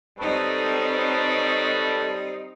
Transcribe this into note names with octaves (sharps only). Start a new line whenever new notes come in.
G3 C4 D#4 A4 B4 C#5